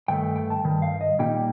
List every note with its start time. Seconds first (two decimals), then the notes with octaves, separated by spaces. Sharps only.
0.08 G2 D#3 A3 G5
0.36 G5
0.50 A5
0.64 G2 D#3
0.82 F5
1.01 D#5
1.19 A#2 G3 A#3 D#4 G5